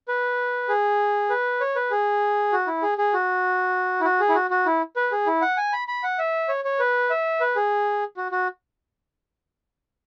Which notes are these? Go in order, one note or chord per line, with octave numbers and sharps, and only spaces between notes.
B4
G#4
B4
C#5
B4
G#4
F#4
E4
G#4
G#4
F#4
E4
F#4
G#4
E4
F#4
F#4
E4
B4
G#4
E4
F#5
G#5
B5
B5
F#5
E5
C#5
C#5
B4
E5
B4
G#4
F#4
F#4